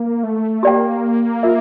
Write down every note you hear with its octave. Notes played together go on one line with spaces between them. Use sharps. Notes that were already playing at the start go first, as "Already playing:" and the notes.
Already playing: A#3
A3
A#3 G4 D5 G5
F4 A#4 E5